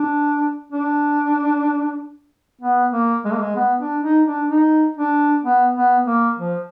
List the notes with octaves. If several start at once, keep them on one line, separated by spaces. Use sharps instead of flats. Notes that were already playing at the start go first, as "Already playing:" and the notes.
Already playing: D4
D4
B3
A#3
G#3
A#3
G#3
B3
D4
D#4
D4
D#4
D4
B3
B3
A#3
F3